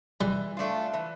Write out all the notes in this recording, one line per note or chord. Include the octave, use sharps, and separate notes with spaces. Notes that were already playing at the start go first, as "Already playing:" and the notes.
E3 G3
A3 D4 F4
E3